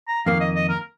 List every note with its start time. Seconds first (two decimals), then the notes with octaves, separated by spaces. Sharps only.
0.08 A#5
0.26 F2 D#3 A#3 F5
0.40 D#5
0.55 D#5
0.69 A#4